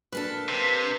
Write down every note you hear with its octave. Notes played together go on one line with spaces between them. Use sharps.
A#3 D4 A4 B4
C3